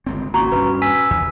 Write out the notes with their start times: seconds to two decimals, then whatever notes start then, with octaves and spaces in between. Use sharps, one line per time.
0.07 G1 C#2 C4
0.34 G#1 A#3 C#4 F#4 A#5 C#6
0.52 D#1 G2 C#4 B4
0.82 G#5 E6 B6
1.11 D#2